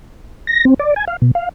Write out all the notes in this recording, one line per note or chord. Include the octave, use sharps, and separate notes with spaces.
A#6
C4
D5
G#5
F5
B2
F5